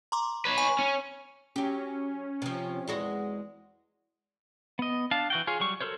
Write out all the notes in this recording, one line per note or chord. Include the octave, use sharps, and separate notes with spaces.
A#5 C6 D6
B4 C#5
G#5 C#6
C#4
F#3 C#4 G4
C3 F3
E2 G#3 F#4
B3 D#5
D4 F5 A5
E3 F#4 G5
F4 G#4 C#5
F#3 G3 C#6
F#4 A4 A#4 C5 C#5